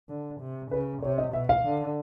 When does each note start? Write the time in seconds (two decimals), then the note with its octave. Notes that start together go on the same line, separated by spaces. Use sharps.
0.09 D3
0.41 C3
0.71 C#3 B4
1.02 C3 C#5
1.18 D#5
1.33 B2 E5
1.49 F5
1.65 D3